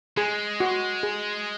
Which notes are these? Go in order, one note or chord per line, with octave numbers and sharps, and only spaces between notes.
G#3 G#4
F#4
G#4